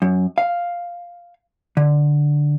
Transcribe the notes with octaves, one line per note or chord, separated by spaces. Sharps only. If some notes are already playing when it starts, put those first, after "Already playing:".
F#2
F5
D3